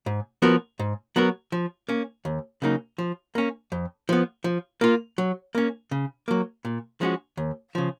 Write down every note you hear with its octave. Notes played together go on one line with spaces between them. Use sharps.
G#2
F3 B3 F#4 A#4
G#2
F#3 B3 F#4 A#4
F3
A#3 C#4
D#2
C#3 F#3 A#3 D#4
F3
A#3 C#4
F2
F3 B3
F3
A#3 F4
F#3
A#3 C#4
C#3
F#3 A#3
A#2
F3 G#3 C#4 F#4
D#2
C#3 F3